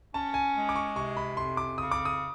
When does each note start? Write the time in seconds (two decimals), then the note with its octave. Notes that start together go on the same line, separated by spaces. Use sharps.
0.14 C#4 A5
0.34 G#5
0.55 G#3
0.69 D6
0.76 C#6
0.96 C3 C#6
1.17 B5
1.37 F2 C6
1.57 D6
1.78 C#3 D#6
1.91 D6
2.05 D#6